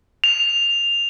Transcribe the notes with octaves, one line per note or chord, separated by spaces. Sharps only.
F7